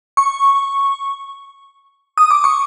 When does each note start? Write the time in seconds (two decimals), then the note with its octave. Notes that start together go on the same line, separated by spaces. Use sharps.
0.17 C#6
2.18 D#6
2.31 D6
2.44 C#6